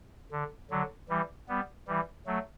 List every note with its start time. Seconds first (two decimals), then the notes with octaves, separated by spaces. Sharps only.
0.32 D3
0.71 D3 F#3
1.09 E3 G3
1.49 G3 B3
1.87 E3 G3
2.27 F#3 A3